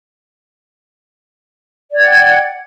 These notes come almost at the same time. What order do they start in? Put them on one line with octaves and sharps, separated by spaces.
D5 G#6 F#5 G5